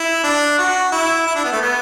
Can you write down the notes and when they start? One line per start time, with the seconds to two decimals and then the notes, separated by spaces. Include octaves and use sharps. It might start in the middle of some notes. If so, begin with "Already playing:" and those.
Already playing: E4
0.23 D4
0.59 F#4
0.92 E4
1.27 E4
1.35 D4
1.44 B3
1.52 A3
1.62 B3